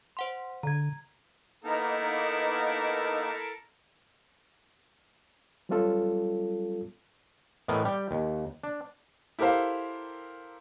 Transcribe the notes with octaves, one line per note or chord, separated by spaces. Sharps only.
C5 F#5 C6
D3 A#5 G#6
A#3 B3 D#4 E4 A4 A#4
F#3 G3 B3 C#4 F4 A4
A2 E3 B3 A#4 D#5
G3 G4 G5
D#2
D4
E4 G4 A4 A#4 C5 F5